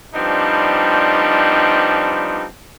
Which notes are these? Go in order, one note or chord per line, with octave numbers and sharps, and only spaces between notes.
F3 G3 B3 C4 D4 D#4